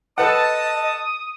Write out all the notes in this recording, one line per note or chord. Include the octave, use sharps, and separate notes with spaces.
A4 B4 D#5 F#5 A5 D#6